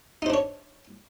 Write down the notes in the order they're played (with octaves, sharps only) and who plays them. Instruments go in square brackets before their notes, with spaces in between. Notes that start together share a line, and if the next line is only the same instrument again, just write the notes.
[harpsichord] D#4
C5
D4
C#5